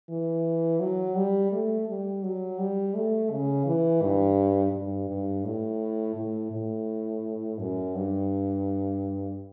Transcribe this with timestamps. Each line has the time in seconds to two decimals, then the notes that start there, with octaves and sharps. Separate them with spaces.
0.10 E3
0.80 F#3
1.17 G3
1.52 A3
1.88 G3
2.23 F#3
2.59 G3
2.95 A3
3.31 C#3
3.66 E3
4.02 G2
4.73 G2
5.09 G2
5.45 A2
6.16 A2
6.51 A2
7.59 F#2
7.95 G2